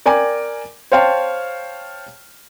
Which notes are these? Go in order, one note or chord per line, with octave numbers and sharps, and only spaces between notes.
A#4 D5 G5 G#5 D6
C5 C#5 F5 G5 A5